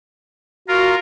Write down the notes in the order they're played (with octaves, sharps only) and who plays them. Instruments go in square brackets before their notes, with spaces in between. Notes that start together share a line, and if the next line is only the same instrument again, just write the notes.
[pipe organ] F4 A#4 [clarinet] F#4